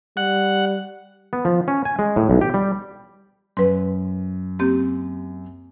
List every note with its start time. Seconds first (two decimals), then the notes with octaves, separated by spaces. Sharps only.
0.17 G3 F#5
1.33 B3
1.45 F3
1.68 C#4
1.85 G#5
1.99 G#3
2.16 A2
2.30 B1
2.41 G4
2.54 G3
3.57 F#2 B4 C6
4.59 A#3 C4 G4